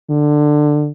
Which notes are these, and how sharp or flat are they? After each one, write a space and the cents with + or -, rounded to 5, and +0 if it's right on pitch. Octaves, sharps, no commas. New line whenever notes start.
D3 +15